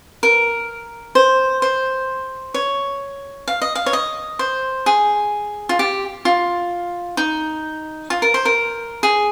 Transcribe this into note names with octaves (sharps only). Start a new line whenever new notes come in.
A#4
C5
C5
C#5
F5
D#5
F5
C#5
D#5
C5
G#4
F4
G4
F4
D#4
F4
A#4
C5
A#4
G#4